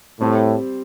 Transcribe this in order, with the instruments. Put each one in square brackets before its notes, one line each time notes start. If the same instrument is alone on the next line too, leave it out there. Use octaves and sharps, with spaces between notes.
[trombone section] A2 [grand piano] G3 C4 G4